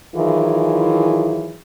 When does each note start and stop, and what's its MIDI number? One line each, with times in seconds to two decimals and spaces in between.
0.16 1.56 51
0.16 1.56 52
0.16 1.56 54
0.16 1.56 64
0.16 1.56 65
0.16 1.56 68